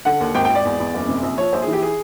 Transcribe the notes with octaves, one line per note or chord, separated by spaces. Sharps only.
D3 F#5
D#2
G#1 G5
G5
G#1
D5
E2
E2
F#1
C3
A#1
F3 C#5
A#1 C5
G#4
E3
G4
G#4